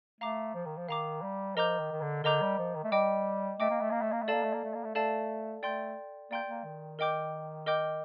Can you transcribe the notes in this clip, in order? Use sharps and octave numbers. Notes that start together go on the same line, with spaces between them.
A3 F5 A#5 D6
F3
D#3
F3
D#3 F5 A#5 D6
G3
F3 A#4 D#5 A#5 D6 G6
D#3
D#3
D3
D3 A#4 D#5 A#5 D6 G6
G3
F3
D#3
A3
G3 D#5 G5 D6
A3 D#5 G5 D6
A#3
A3
A#3
A3
A#3
A3
A#3 A4 D5 F5 A5
A3
A#3
A3
A#3
A3
A3 A4 D5 F5 A5
A3 D5 G5 C6 G6
A#3 D5 G5 C6 G6
A#3
D#3
A#4 D#5 G5 D6 G6
A#4 D#5 G5 D6 G6